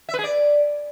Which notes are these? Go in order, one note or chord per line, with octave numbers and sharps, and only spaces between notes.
E5
B4
G#4
D5